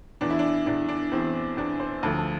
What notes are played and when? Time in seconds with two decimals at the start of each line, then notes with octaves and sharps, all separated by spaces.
0.21 E2 E3 D4
0.30 E4
0.39 D4
0.66 E2 E3 D4
0.89 D4
1.12 E2 E3 C4
1.57 E2 E3 D4
1.80 C5
2.03 D2 D3 F3 A5
2.18 A5